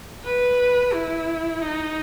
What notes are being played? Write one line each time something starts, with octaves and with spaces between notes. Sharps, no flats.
B4
E4
D#4